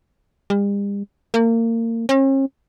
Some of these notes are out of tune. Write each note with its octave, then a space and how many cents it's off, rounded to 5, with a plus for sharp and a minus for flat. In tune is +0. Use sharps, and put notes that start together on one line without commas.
G3 +45
A#3 -30
C#4 -45